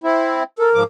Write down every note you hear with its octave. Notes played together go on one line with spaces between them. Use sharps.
C4 E4
A4 A#4
G#2 F3 D6